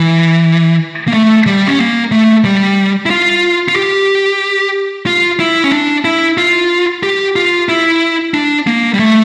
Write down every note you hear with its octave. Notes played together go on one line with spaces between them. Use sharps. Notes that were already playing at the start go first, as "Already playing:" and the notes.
Already playing: E3
A#3
A3
G3
C#4
A#3
A3
G3
E4
F4
F4
G4
F4
E4
C#4
D4
E4
F4
G4
F4
E4
D4
A#3
G3
A3